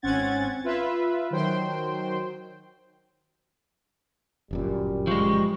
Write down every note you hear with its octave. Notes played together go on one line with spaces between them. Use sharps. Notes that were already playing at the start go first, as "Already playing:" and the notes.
G#1 C4 C#4 F#5 G#6 A6
F4 B4 E5
D#3 F#3 C5 G5 C6
G1 F#2 A#2 G3
F3 G#3 C#6